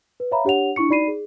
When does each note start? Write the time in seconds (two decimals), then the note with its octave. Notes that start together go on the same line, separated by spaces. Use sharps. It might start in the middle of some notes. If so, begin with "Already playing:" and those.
0.20 B4
0.31 C#5 E5 F5 A#5 B5
0.45 D4 G4 C#5 F#5 F7
0.76 D4 E4 C#6 C#7
0.89 D#4 F#4 D5 B5 C7 D#7
1.08 G#4